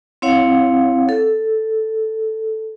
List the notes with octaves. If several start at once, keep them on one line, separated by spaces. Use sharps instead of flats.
C4 E4 C#5 F5 F#5
A4